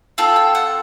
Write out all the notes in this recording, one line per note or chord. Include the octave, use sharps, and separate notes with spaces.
C4 F4 A4 G5
G5
F#5